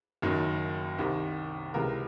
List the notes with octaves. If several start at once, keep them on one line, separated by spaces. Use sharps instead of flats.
F#1 F#2 D#3 F#3
C2 C3 D#3
C#2 C3 E3 G#3 A#4